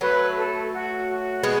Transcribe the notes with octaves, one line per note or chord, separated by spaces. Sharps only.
F#3 A3 B4
A4
F#4
F#4
G#3 B3